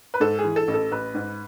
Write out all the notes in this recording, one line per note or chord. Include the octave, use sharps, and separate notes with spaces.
B4
G#2 A4
G#4
E3
A4
A1
A4
A1 B4
G#2